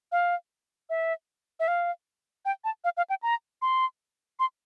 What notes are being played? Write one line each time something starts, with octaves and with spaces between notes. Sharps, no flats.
F5
E5
E5
F5
G5
A5
F5
F5
G5
A#5
C6
C6